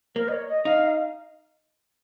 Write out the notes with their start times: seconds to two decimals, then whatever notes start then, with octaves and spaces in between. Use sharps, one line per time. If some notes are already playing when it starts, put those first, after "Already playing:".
0.15 A#3 A#4
0.28 D#5
0.32 C#5
0.49 D#5
0.65 D#4 F5
0.85 F5